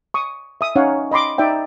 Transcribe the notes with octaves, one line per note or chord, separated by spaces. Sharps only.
C#6 D#6
E5 D#6
C#4 D#4 C#5 F5 F#5
D#5 B5 C6 D6
D#4 D5 E5 G5